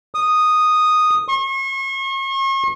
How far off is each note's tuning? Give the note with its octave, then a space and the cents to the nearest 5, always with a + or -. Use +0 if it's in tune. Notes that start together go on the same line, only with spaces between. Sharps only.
D#6 -5
C#6 -40